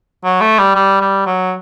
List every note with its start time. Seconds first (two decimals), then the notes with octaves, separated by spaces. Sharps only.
0.24 F#3
0.41 A3
0.58 G3
0.75 G3
1.01 G3
1.26 F#3